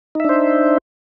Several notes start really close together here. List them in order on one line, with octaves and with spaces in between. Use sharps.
D#4 E5 D4 C5